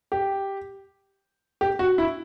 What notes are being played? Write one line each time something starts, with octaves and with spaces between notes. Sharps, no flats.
G4
G4
F#4
E4